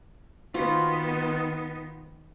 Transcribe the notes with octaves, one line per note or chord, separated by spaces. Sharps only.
D#3 B3 F4 F#4 C5